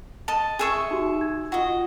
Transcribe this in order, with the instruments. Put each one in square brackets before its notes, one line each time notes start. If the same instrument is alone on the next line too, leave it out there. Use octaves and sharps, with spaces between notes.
[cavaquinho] D#5 A5
G#4 E5 C#6
[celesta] D#4 F#4 G4
G#6
[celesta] F4 F#5 [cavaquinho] F#4 D#5